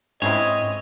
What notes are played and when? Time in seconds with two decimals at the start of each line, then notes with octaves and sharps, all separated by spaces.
0.22 G#2 G#3 C4 C#4 E4 C#5 D#5